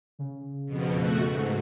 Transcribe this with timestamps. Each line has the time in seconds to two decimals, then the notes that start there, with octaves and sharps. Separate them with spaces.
0.19 C#3
0.66 F2 B2
0.96 A3 F#4
1.27 G#2